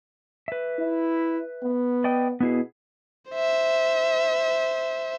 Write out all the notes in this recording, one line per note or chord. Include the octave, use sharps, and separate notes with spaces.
B4 E5
E4
B3
D5 D#5 G5
B2 B3 E4 G#4
C5 E5